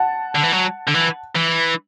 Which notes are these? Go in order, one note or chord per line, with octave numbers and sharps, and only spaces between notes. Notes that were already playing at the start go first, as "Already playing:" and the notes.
Already playing: F#5 A5
D3
E3
F#3
D3
E3
E3